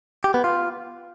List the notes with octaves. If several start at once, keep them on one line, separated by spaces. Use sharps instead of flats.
G4
B3
F4